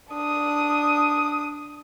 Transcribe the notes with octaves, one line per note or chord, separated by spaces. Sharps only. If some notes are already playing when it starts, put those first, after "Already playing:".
D4 D#6